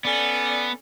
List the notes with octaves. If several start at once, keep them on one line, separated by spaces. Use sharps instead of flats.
B3 C#4 A4 D5